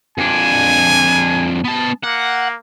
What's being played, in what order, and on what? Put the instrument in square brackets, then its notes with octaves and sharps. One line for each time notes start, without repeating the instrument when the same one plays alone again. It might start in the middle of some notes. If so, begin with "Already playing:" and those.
[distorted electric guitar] F2 D4 [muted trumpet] G#5
[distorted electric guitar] B3 A5
[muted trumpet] A#3 [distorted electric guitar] F#5